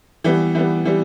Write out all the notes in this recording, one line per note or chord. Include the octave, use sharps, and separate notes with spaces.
E3 G3 B3
E3 G3 B3
E3 G3